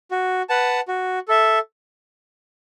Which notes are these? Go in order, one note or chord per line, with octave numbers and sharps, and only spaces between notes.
F#4
B4 F#5 A5
F#4
A4 E5